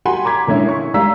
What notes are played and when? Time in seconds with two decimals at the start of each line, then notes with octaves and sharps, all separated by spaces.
0.05 F#4 G4 F#5 G#5 B5 C6
0.25 A#5 D6 G#6 B6
0.47 A#2 D3 G#3 C#4 E4
0.69 C#6
0.94 G3 G#3 F5 A#5 E6 B6